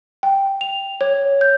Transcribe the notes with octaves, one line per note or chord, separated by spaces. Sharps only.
G5
F7
C#5
G6